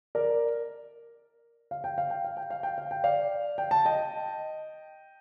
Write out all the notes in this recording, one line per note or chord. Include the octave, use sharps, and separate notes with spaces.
A#4 D5
F5
G5
F5
G5
F5
G5
F5
G5
F5
G5
D5 F5
G5
A5
D#5 G5